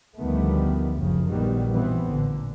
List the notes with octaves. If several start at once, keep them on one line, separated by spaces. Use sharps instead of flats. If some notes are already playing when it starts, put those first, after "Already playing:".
D2 D#3 F3 G3 A3 B3
G1 F#2 C#3 F3
A#1 D#3 F#3 G3 B3
B2 E3 B3 C4
A1 A#2 D3